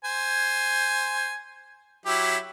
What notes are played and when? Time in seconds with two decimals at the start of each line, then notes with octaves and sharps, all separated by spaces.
0.04 C5 G#5
2.06 F#3 E4 G4